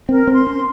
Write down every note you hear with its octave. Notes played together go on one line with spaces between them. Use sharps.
C4 A#4
C4
C6
C#4